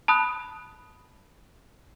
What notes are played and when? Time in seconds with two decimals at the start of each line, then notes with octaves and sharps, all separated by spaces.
0.08 A5 B5 D#6 F#6